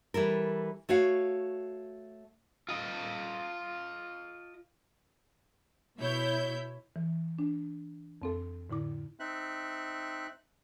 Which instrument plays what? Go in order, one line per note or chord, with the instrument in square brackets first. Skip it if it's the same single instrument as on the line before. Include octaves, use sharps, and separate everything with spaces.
[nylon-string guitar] E3 G3 A4 A#4
A3 F#4 C#5 F5
[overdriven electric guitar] F4 D#5
[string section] B2 E4 C#5 E5 G6
[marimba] E3
D4
F2 C4 A4
A2 D3 E4 D6
[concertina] C4 D#4 E5 F#6